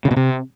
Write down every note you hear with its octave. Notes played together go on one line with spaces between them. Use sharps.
C#3
B2
C3